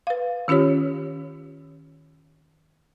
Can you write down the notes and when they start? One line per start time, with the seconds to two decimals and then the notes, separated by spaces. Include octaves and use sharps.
0.07 B4 F5
0.48 D#3 C#4 F4 G4 C#5